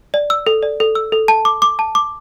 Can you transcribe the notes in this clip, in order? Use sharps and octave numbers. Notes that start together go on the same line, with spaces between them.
D5
E6
A4
D5
A4
E6
A4
A5
D6
D6
A5
D6